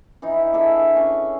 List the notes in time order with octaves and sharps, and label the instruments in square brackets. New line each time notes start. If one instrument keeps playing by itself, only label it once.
[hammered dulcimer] E3 D#4 E4
D4 G#4 A4 E5
C#4